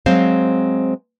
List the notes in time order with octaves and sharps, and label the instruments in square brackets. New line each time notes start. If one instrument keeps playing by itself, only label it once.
[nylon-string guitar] F#3 G#3 C4 C5 F5